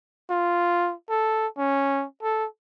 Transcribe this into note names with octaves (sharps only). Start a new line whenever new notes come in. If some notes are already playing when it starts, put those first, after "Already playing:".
F4
A4
C#4
A4